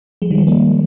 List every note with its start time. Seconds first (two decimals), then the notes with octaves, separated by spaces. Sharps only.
0.22 F3 G#3
0.31 D#3 G3
0.38 F3 G#3
0.47 G3 A#3